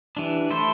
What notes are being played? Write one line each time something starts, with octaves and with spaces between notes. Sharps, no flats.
E3 G3 D4
A3 E4 A4 C5